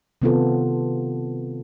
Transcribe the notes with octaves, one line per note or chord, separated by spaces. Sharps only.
C3 D#3 B3 C4 F4 A4